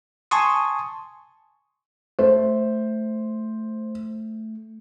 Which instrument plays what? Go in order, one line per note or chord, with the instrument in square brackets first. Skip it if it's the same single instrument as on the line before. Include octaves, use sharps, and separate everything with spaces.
[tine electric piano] G#5 A5 C6 C#6 D#6
[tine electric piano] A3 [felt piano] C5